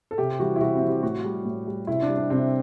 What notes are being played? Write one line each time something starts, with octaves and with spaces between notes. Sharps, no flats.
A4
C3 G4
E3 G3 F#4
E4
C3 F#4
C4
E3 G3
G4
A2 F#4
G3
A2
G3
C3 E4
D4
G3
D4
C3 C4